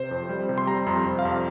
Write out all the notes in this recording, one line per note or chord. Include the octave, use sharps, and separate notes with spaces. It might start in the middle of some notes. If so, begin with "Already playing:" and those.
Already playing: C3 C5
F2
G3
C3
C6
G3 A#5
F2
F2
F5
F2